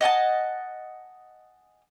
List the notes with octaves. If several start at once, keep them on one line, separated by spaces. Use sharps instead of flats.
D#5 F#5 G#5 A5